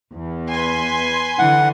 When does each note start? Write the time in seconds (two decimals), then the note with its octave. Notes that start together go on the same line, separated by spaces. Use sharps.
0.14 E2
0.51 B4 G#5 C6
1.39 D3 E3 F#5